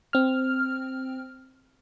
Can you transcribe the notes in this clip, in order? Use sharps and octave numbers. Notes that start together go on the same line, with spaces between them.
C4 F6